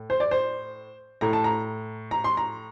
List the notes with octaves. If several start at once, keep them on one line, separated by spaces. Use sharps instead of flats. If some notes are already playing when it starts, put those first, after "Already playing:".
Already playing: A2
C5
D5
C5
A2 A#5
A5
A#5
A#5
C6
A#5